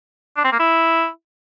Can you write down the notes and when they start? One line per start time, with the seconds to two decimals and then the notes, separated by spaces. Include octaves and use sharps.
0.37 D4
0.44 C4
0.52 A#3
0.60 E4